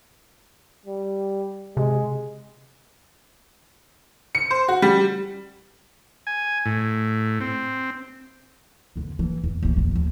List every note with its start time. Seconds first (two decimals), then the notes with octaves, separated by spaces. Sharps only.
0.86 G3
1.77 C3 G#3
4.35 C#7
4.51 C5
4.68 F#4
4.82 G3
6.27 G#5
6.66 A2
7.41 C4
8.96 E2 D3
9.19 E3 A#3
9.44 E2
9.63 D#2 E3
9.77 A#1 F2
9.92 D#2 F3